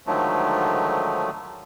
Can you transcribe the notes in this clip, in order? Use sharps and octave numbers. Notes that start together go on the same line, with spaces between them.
G#2 D3 D#3 F3 F#3 A3